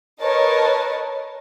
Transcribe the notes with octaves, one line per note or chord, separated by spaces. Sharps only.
A#4 B4 C#5 D#5 A5